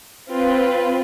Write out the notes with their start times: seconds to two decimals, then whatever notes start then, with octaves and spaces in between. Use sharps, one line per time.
0.32 C4 F4 B4